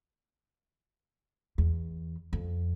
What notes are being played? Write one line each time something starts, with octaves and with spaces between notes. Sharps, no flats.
E2
F2